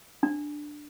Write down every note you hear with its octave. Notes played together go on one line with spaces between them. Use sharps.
D4